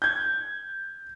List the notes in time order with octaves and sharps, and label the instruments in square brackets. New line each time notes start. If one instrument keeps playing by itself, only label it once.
[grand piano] G6 G#6